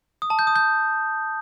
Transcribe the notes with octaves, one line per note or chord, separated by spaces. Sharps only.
D#6
A5
G6
D#6
G6